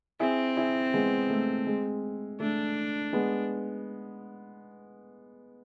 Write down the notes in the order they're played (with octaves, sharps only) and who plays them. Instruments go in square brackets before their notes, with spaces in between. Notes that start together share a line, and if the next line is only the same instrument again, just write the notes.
[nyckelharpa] C4 [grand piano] E4 G#4
[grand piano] E4 G#4
G#3 B3
A3
G#3
[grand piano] A3 [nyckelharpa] D4
[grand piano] G#3 B3